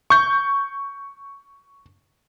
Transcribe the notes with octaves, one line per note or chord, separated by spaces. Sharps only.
C#6 G6